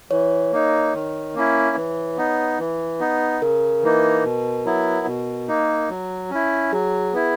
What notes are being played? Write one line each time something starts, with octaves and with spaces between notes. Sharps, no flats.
E3 C#5
A#3 D#4
D#3
A#3 C#4 E4
E3
B3 D#4
E3
B3 D#4
C#3 A#4
E3 A#3 D#4
B2
F#3 B3 E4
B2
A#3 D#4
F#3
C#4 E4
F#3 G#4
B3 E4